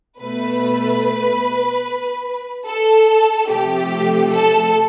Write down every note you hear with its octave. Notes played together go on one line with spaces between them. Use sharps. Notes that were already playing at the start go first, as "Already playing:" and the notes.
B2 A3 B4
A4
C3 F3 A3 G4
A4